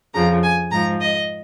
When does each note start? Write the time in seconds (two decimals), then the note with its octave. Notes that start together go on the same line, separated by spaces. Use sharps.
0.14 F2 C#3 F3 A#5
0.43 G#5
0.71 G#2 F3 A#5
1.00 D#5